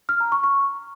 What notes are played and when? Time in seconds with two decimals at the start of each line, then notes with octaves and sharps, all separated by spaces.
0.09 F6
0.20 A#5
0.32 C#6
0.44 C#6